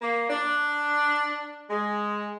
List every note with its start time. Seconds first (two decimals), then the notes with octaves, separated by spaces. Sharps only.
0.02 A#3
0.30 D4
1.70 G#3